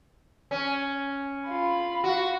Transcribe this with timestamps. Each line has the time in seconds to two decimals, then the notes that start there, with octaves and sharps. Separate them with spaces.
0.51 C#4
1.48 F4 B5
2.04 F#4